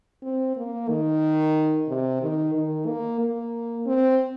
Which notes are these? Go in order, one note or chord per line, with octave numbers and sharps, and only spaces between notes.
C4
A#3
D#3
C3
D#3
D#3
A#3
A#3
C4